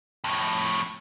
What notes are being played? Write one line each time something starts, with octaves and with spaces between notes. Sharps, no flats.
F2 A2